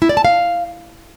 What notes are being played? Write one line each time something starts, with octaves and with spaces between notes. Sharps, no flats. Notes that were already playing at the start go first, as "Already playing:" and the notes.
E4
D5
A5
F5